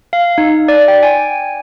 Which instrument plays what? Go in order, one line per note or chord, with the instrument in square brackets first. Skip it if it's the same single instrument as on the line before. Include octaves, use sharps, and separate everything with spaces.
[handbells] F5
D#4
D5
G5
G#5